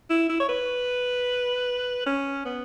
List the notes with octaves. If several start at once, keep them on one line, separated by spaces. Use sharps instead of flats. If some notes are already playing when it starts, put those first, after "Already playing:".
E4
E4
C#5
B4
C#4
B3